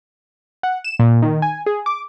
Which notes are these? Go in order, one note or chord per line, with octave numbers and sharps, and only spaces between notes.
F#5
E7
A#2
D#3
G#5
G#4
D6